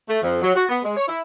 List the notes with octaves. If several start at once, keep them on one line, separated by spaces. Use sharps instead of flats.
A3
F2
F#3
F#4
B3
G#3
C#5
E4